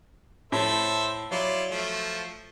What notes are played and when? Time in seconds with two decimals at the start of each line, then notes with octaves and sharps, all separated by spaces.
0.52 A2 A4 C5 E5
1.31 F#3 E4 F4 D5
1.70 F3 A3